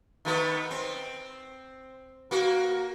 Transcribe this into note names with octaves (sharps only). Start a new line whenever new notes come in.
D#3 A3 B3
C4
A#3 F#4